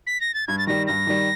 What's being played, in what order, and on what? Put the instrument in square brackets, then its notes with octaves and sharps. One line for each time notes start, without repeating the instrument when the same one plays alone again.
[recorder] B6
A#6
A6
[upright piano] G2 [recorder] G#6
[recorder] A6
[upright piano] D#3 G3 [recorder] A#6
[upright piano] G2 [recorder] A#6
[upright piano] D#3 G3